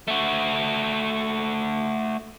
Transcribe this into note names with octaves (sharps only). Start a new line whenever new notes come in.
A3 F#4